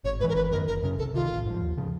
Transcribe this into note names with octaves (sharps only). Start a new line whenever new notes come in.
G#1 C#5
G#2 E3 B4
A#4
G#1 B4
F#2 D#3 A#4
F#1 A#4
F#2 C#3 A#4
C2 A4
C3 D#3 F4
A1
G#2 F3
D#2
C#3 F3